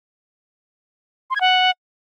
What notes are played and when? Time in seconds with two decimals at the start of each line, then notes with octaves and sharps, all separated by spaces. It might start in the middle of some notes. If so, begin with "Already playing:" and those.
1.31 C6
1.36 G#6
1.41 F#5